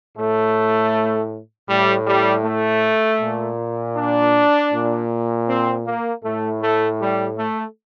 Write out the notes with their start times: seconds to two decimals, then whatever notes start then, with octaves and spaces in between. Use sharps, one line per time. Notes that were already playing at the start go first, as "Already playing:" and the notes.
0.17 A2 A3
1.69 A2 G3
2.07 G3
2.44 A3
3.20 A#2
3.96 D4
4.72 A#2
5.48 C4
5.86 A#3
6.23 A2 A3
6.62 A3
7.00 G3
7.38 A3